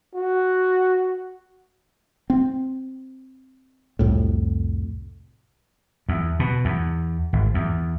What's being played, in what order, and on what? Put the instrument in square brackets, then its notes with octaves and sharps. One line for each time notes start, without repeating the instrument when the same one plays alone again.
[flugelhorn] F#4
[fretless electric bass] C4
C2 F2 A2
[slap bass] E2
B2
E2
G#1
E2